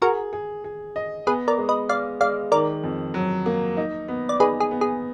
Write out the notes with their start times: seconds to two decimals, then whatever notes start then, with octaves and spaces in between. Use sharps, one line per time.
0.02 F#4 G#4 A#4
0.33 G#4
0.64 G#4
0.96 D#5
1.27 B3 G#4 B4
1.48 A#4 D5
1.58 G#3
1.69 B4 D#5
1.89 G#3 D5 F5
2.21 G#3 D5 F5
2.52 D#3 A#4 D5
2.84 F2
3.14 F#3
3.46 A#3
3.77 D#4
4.08 B3
4.29 D5
4.40 D#4 G#4 B4
4.60 G#4
4.71 B3
4.81 G#4